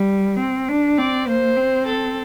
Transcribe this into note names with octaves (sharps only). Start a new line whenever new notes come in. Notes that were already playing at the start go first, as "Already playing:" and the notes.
Already playing: G3
C4
D4
C4 D5
A#3 C5
C4
A4